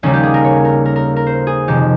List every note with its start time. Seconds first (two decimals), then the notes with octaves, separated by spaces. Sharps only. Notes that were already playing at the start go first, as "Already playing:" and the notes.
0.03 D#2 C#3 G3 A#3 C#4
0.13 G4
0.23 G#4
0.34 A#4
0.44 C#5
0.65 A#4
0.86 A#4
0.96 A#4
1.16 A#4
1.26 C5
1.47 G#4
1.68 F2 C3 D#3 G4